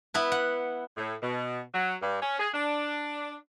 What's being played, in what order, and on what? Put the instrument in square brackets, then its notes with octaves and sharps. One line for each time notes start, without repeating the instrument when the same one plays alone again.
[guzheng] B3 E4 B4
F#5
[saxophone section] A2
B2
F#3
G2
C#4
G#4
D4